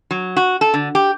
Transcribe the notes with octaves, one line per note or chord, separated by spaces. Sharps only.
F#3
F#4
A4
D3
G4